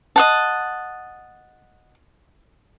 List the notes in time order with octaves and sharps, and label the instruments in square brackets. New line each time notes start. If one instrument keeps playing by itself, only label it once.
[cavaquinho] D#5 F#5 A5